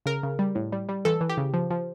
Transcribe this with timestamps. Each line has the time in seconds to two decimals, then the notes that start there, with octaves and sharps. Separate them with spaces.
0.06 C#3 A#4
0.23 C#3
0.39 G3
0.55 A2
0.72 G3
0.89 G3
1.05 E3 A4
1.21 E3
1.29 G4
1.37 C#3
1.54 F3
1.70 F3